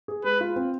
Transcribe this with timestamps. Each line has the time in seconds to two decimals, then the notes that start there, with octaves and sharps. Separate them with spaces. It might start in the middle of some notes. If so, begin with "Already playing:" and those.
0.08 G#4
0.24 G#3 B4
0.41 F4
0.56 C4